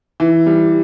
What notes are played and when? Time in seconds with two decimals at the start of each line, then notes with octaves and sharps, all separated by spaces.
0.20 E3
0.46 G3